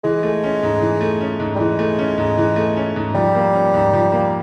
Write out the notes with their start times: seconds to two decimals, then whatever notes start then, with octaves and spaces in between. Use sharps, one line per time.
0.04 E3 G#3
0.23 A3
0.44 C#4
0.63 G#2
0.81 E3
1.01 A3
1.21 C#4
1.40 G#2
1.55 G3
1.59 E3 G#3
1.79 A3
1.99 C#4
2.18 G#2
2.38 E3
2.56 A3
2.76 C#4
2.96 G#2
3.15 F3 G3
3.35 A#3
3.53 C#4
3.74 G#2
3.93 F3
4.12 A#3